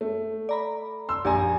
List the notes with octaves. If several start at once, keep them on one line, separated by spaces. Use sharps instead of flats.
A3
D5 A#5 B5
C6 E6
A#1 G4 D5 G#5 A#5